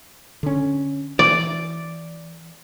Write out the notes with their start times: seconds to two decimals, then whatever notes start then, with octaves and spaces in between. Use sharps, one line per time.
0.43 D3 C#4
1.19 E3 D5